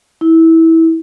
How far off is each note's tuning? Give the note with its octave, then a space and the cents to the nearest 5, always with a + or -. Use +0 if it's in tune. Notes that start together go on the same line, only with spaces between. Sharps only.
E4 -20